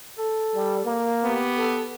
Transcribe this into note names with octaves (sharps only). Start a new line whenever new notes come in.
A4
G3
A#3
B3 G4
A4